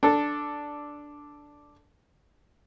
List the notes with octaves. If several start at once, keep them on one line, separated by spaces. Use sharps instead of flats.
D4 A4